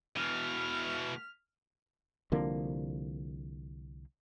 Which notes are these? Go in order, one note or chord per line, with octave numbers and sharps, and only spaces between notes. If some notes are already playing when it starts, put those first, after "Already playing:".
B2 E3 F6
C2 D3 F3 A#3